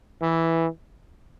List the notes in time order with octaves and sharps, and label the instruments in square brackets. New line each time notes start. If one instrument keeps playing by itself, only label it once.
[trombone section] E3